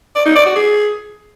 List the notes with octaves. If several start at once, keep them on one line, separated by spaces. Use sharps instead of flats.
D5
D#4
D5
F#4
G#4